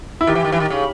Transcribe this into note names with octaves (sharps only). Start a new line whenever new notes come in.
E4
D#3 G4
E3
D#3
E3
D#3
C#3